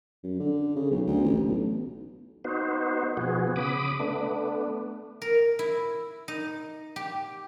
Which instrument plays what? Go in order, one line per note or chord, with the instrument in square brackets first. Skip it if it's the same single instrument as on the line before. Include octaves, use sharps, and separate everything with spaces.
[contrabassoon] F#2
D3
C#3
B1
D2
A1
B1
[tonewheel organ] B3 D#4 F#4 C5
B2 F3 B3 F#4 G#4
C#3 B5 D6 D#6
A3 B3 D4
[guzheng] A#4
E4
D#4
G4